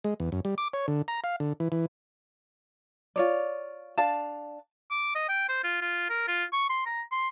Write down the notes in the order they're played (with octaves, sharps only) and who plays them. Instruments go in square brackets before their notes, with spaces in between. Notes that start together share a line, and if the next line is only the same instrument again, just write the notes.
[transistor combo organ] G#3
E2
F#2
G3
D6
C#5
D3
A#5
F5
D3
E3
E3
[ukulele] F4 C#5 D5
D4 D5 F5 A5
[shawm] D6
D#5
G5
C5
F4
F4
A#4
F4
C#6
C6
A#5
C6